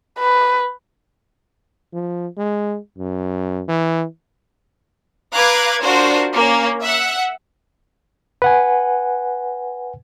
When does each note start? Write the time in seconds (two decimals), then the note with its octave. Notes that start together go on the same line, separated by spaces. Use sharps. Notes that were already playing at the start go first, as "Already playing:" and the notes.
0.19 B4
1.93 F3
2.37 G#3
2.98 F#2
3.68 E3
5.33 B4 F5 A#5 D6 F#6 G#6
5.80 D4 F4 F#4 A#4 C5
6.35 A#3 C#4
6.81 E5 F#5
8.42 B4 F#5 G#5